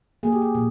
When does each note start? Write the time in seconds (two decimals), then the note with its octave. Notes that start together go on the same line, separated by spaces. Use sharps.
0.23 A#3 G#4
0.32 G4
0.42 G#4
0.55 A#2